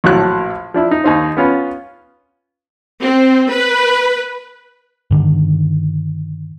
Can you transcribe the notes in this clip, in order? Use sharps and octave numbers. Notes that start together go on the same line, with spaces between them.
A#1 A2 F#3 A5 F#6
F3 D4 E4
D#4
D#2 D#4 C5
B3 C#4 F4 B4
C4
B4
G2 D3 D#3